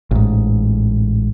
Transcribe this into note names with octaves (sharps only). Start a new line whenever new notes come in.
A1 G#2